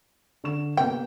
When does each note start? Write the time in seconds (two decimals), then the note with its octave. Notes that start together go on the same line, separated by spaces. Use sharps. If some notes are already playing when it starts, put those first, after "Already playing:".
0.44 D3 C#6 E7
0.77 C3 A#3 B3 G5